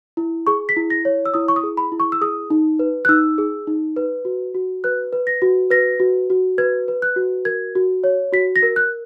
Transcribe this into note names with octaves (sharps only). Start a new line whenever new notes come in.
E4
G#4 C#6
B6
E4
A#6
C#5
E6
E4 D#6
C#6
D#6
G#4
B5
E4
C#6
E6
G#4 D#6
D#4
B4
F#6
D#4 E6
G#4
D#4
B4
F#4
F#4
B4 F#6
B4
A#6
F#4
B4 A#6
F#4
F#4
B4 G#6
B4
F#6
F#4
A#4 G#6
F#4
C#5
F#4 B6
A#6
A#4
F#6